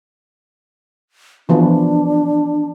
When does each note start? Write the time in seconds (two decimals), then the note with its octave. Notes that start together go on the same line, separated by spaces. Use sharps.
1.49 E3 F3 B3 D4